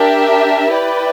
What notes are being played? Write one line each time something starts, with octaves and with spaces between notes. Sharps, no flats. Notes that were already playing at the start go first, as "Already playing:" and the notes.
Already playing: D4 G4 A#4 E5 G5
E4 B4 D5 G5